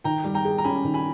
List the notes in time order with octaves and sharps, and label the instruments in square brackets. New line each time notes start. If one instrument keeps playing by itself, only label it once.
[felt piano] D#3 [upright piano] G5 A#5
[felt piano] G3
[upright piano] G5 A#5
[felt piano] G#4
[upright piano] A#5
[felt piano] C#4 [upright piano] G#5 B5
[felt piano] D#3
[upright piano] G#5 B5